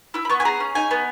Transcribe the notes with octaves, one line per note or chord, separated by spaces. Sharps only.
E4 E6
B5
B3 C#6
G#5
G#4 A#5
C#4
D#4 G#5
B3